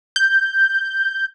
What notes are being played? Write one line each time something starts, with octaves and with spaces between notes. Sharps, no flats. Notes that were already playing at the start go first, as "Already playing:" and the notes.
G6